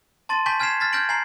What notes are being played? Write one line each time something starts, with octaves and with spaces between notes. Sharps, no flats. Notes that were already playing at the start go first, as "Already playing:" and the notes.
A5 C6 A6 D#7
G#5 A5 C#6 G6 B6 F#7
G#5 F6 G#6 B6 C7 E7
F6 A6 B6
F6 G6 G#6 A#6 D7 F#7
G#5 A#5 C7 F#7